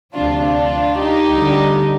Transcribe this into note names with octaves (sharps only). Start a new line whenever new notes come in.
D2 C3 F3 D4 F4
D4 F4
D#4 G4
D2 D3 G3